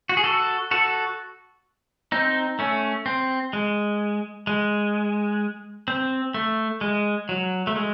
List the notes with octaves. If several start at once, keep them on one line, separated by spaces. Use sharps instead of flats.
F#4
G#4
F#4 A4
F#4 A4
C4 D#4
A3 C#4
C4
G#3
G#3
C4
A3
G#3
F#3
A3
G#3